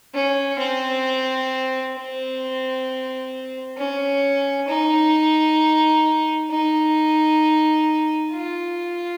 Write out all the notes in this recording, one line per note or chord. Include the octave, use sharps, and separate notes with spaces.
C#4
C4
C4
C#4
D#4
D#4
F4